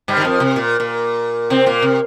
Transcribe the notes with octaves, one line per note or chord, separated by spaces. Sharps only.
G2 G3
D#3
F2 F3
C3
A#2
A#2
C3 C4
A#2 A#3
C3